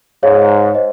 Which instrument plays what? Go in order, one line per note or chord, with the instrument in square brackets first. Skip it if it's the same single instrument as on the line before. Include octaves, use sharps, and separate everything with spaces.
[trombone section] G#2 [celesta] G#4 C#5 F5
[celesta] C5 D#5